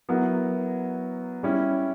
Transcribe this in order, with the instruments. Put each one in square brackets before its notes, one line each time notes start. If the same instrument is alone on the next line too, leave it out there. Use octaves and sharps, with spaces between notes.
[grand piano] F#3 B3 E4 A#4
G3 C#4 E4